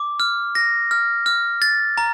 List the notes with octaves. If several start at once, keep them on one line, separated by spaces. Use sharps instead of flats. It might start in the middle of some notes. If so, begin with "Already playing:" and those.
Already playing: D6
F6
A#6
F6
F6
A6
A#5